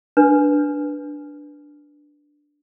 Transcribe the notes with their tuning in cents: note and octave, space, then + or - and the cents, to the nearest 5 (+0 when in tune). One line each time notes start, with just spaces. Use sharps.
D4 +0 B4 -5